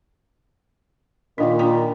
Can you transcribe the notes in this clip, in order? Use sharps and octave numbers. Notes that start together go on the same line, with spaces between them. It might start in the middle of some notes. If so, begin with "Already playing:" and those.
A#2 D#3 D4 F4
D4 F4 G5